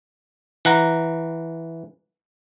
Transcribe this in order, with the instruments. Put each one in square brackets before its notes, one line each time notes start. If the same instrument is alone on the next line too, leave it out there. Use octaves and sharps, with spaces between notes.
[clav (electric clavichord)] E3 F#5 A#5